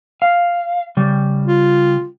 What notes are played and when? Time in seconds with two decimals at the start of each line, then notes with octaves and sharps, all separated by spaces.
0.22 F5
0.97 C#3 G3
1.47 F4